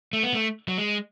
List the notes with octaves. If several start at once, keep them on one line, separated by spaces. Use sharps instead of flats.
A3
B3
A3
F#3
G#3